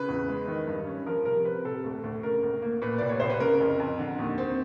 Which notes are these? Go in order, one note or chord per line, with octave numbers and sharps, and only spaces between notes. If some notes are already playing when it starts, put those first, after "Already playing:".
Already playing: C#3 B4
E2
G#3
D#3
G2
C#4
F3 A#4
C3 A#4
C4 B4
C3 A4
D2
D2
C#3 A#4
D2
A#3
A#2 B4
C2 D5
C#5
C2 C5
B4
C#3 A#4
F2
F2
D3
D#2
C4